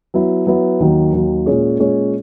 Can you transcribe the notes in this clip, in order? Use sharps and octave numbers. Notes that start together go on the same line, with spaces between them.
F#3 B3 E4
F#3 B3 E4
D#2 D#3 F#3
D#2 D#3 F#3
A#2 G#3 C#4 G#4 C#5
A#2 G#3 C#4 G#4 C#5